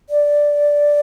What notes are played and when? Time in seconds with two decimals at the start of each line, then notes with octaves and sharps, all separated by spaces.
0.10 D5